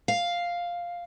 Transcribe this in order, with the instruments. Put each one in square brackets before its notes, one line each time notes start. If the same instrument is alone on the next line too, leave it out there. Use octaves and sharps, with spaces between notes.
[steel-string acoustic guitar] F5